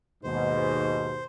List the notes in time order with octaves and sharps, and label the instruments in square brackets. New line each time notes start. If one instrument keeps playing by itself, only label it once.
[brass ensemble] D#2 G#2 B2 [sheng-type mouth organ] C5